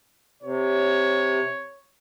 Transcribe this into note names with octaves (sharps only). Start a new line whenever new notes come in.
C3 C#5